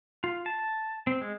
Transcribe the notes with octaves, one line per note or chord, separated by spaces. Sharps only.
F4
A5
C4
G#3